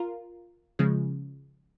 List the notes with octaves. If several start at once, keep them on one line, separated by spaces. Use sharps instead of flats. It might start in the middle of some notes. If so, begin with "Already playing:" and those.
Already playing: F4 A#4
C#3 F3 G#3